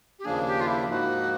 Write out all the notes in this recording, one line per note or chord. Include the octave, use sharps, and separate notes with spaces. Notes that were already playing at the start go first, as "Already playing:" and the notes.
G4
D#2 C#3 F3 A#3 D4 G#4
G4
F4
E4
G#2 F3 A#3 D#4 F#4